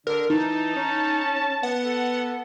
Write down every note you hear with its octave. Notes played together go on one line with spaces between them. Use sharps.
D3 D4 A#4
E3 D#4 A5
C#4
B3 F#5
A4